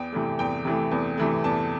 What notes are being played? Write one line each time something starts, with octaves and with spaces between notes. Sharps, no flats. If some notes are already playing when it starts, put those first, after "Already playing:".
Already playing: E2 G5
C3 E3 A3
E2 G5
C3 E3 A3
E2
C3 E3 A3
E2 A5